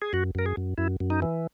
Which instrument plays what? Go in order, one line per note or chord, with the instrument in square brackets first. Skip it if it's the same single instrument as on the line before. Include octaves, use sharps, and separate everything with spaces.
[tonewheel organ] G#4
F#2 F#4
F#2 A#4
G#4
F#2
F#2 E4
F#2
D#4
E3